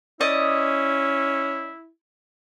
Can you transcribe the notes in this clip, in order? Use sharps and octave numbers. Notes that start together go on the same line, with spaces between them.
C#4 E4 D5 D#5 D#6